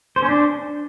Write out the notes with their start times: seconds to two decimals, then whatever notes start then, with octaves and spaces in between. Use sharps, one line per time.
0.16 C5
0.22 C#4
0.29 D4